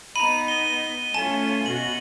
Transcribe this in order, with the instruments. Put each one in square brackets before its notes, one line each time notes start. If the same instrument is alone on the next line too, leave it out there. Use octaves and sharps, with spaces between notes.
[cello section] B3 D#4 [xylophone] A#5 B5 [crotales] D#7
[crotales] G7
[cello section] A3 C#4 F4 [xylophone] G#5 A5 D#7
[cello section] B2 F#4 [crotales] F#7